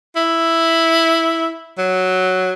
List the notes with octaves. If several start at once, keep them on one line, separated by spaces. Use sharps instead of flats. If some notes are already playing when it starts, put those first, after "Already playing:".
E4
F#3